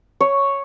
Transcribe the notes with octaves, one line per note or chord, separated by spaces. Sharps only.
C#5